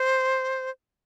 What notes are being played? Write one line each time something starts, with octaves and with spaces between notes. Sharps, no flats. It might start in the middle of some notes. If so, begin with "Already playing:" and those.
Already playing: C5